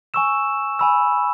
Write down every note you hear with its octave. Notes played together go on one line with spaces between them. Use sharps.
G#5 C#6 E6 E7
G#5 B5 E6